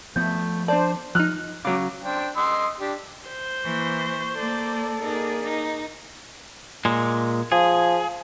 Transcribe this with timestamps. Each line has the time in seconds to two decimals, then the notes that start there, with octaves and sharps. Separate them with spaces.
0.16 F3 A3 B3 G6
0.68 D4 C5 D5 A5
1.15 F3 D#4 F6 F#6
1.65 C#3 F#3 D6
2.03 D4 C5 G5
2.37 D#5 C6 E6
2.80 D4 G4
3.29 C5
3.65 E3 A#3 C#6
4.36 A#3 A4 D5
5.01 A#3 D#4 G#4 D5
5.43 D#4
6.85 A#2 G#3
7.52 F3 G#4